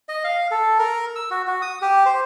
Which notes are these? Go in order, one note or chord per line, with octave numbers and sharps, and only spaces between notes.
D#5
F5
A4
A#4
E6
F#4
F#4
D#6
G4
C5